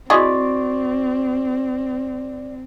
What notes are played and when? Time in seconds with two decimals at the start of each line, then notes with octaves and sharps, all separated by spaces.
0.10 C4 E4 F#4 G#4 D5 D#5 C6 C#6